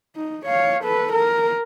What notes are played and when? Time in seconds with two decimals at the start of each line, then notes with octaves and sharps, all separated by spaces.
0.16 D#4
0.46 C#5 F5
0.84 A4 B4
1.13 A#4